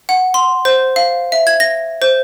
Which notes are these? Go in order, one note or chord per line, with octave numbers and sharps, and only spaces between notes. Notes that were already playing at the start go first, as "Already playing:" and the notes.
F#5
C6
C5
F5
E5
G#6
A#6
C5